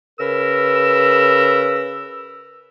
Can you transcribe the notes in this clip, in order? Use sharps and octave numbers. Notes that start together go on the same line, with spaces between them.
C#3 A#4 B4 E6